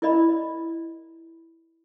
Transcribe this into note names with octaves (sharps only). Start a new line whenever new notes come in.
E4 A#4 D5 D#5 A#5 B5